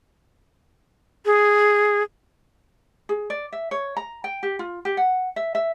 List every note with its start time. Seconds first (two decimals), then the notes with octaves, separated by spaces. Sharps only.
1.26 G#4
3.09 G#4
3.30 D5
3.52 E5
3.71 C#5
3.97 A#5
4.24 G5
4.43 G4
4.59 F4
4.85 G4
4.97 F#5
5.36 E5
5.55 E5